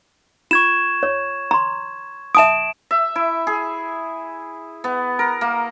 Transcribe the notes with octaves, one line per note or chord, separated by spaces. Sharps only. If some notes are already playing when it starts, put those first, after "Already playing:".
F4 C#6 G#6 E7
C#5
A#5 C6
E5 A5 D#6 D7 E7
E5
E4
G#4
B3
A#4
A#3